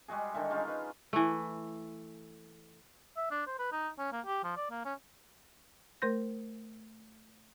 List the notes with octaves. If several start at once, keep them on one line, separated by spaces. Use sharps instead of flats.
G3 G#3 F#4 G#4
D3 D#3 G3 E4
G#3 C#4 D#4 F4
B4
E3 A3
E5
D4
C5
B4
D#4
C#4
A#3
G4
F3
D5
A#3
C#4
A3 A#4 C5 C6 G6 A#6